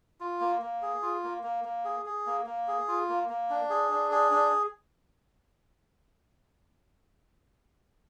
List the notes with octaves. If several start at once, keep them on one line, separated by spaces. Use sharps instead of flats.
F4
A#3
A#3
G#4
F4
A#3
A#3
A#3
G#4
G#4
A#3
A#3
G#4
F4
A#3
A#3
D4
G#4
D4
G#4
D4